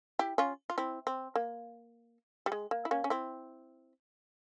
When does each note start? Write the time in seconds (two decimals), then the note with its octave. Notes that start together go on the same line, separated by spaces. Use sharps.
0.19 E4 G4
0.38 C#4 F4
0.70 F4
0.78 C4 E4
1.07 C4
1.36 A#3
2.46 G3
2.52 G#3
2.71 A#3
2.85 E4
2.91 A#3 C#4
3.04 C#4
3.10 C4 E4